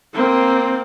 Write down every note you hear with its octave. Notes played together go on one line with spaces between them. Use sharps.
A#3 C4